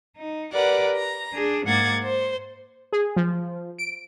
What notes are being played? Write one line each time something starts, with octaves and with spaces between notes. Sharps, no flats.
D#4
G4 A#4 B4 D5 F#5
A#5
D4 G#4
G#2 A#3 F#5 D6 G#6 A6
C5
G#4
F3
D7